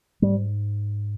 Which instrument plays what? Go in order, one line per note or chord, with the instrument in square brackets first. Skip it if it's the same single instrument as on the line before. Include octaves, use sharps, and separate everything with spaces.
[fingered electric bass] G#2 G3